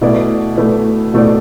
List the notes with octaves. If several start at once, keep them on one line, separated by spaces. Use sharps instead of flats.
B2 A3 E4 B4 D5
B2 A3 E4 B4 D5
B2 A3 E4 B4 D5